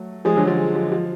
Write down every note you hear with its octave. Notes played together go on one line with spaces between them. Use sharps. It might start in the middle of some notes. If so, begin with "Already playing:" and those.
Already playing: F#3 A3
F3 G#3 G#4
D3 F#3
F3
F3
F3